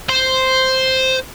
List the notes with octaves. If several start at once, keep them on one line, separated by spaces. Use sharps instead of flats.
C5